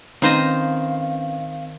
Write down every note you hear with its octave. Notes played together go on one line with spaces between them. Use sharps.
D#3 C4 C#4 D#4 B4 C5 D#5 F5